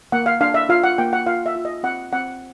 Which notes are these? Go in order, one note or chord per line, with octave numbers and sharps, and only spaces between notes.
A#3 F#5
F5
D4 F5
E5
F4 F5
F#5
A#3 G5
F#5
F4 F5
E5
F4
D#5
C4 F#5
C4 F#5